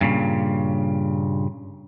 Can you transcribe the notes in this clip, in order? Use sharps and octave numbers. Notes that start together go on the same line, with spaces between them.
G2 A#2 C#3